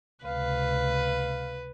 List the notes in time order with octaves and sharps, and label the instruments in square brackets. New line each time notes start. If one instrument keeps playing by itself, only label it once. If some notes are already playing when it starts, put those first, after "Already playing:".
[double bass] C#2 C3 [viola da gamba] B4 [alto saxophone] F5